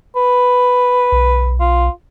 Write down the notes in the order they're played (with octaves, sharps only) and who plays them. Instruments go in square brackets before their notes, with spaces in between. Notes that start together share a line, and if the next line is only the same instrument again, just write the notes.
[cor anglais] B4
[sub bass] B1
[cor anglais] F4